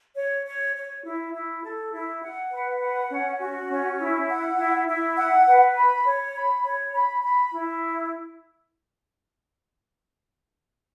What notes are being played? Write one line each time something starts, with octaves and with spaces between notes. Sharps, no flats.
C#5
C#5
C#5
E4
E4
A4
E4
F#5
B4
F#5
C#4
F#4
C#4
E4
F#5
E4
E4
F#5
B4
B5
C#5
B5
C#5
B5
B5
E4